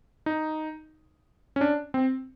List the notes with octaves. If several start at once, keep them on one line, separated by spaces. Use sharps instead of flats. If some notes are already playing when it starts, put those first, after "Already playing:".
D#4
C#4
D4
C4